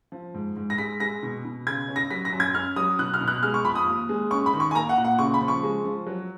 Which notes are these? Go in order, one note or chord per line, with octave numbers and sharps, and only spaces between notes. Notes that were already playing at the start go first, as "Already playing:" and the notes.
F3
G#2
G#2
A#6
G#3 B6
G#3 A#6
B2
B2
C#3 G#6
C#4
A#6
F#3 B6
A#6
F#2
G#6
C#4 F6
F#3 D#6
B2 F#6
F6
B2
F#6
G#3 F6
C#6
F2 B5
D#6
D#2
G#3
C#4 C#6
B5
D#3
C#6
G#5
A#3 A#5
F#5
A#2
F#5
C#3 C#6
B5
F3
C#6
G#3
F3
F#3